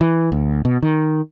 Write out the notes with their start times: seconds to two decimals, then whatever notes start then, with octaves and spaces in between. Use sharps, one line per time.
0.01 E3
0.32 D2
0.65 B2
0.83 D#3